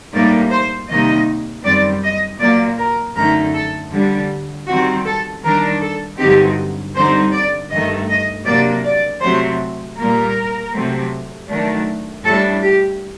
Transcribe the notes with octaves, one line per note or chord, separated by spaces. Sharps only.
A2 G3 A#3 D#4 D5
C5
C3 D#3 G3 A#3 D#4 D#5
F#2 D#3 G3 C4 D5
D#5
A#2 F#3 A#3 D5
A#4
F#2 D3 A3 D#4 A#4
A4
D3 G3 D4
D#3 G3 C4 D#4 F#4
A4
D#3 G3 D4 A#4
A4
G2 D3 F#3 C4 D#4 G4
D3 G3 C4 D#4 C5
D5
G2 D#3 A3 D#5
D#5
C3 F#3 A#3 D4 D5
D5
C3 F#3 A3 C4 C5
A#2 G3 A#3 A#4
C3 F#3 A3 C4
D#3 F#3 A3 D4
A2 G3 D4 A4
G4